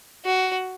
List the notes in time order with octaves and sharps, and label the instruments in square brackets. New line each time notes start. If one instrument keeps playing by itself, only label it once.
[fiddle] F#4